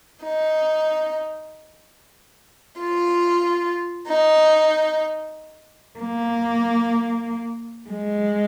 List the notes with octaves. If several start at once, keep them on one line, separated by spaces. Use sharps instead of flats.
D#4
F4
D#4
A#3
G#3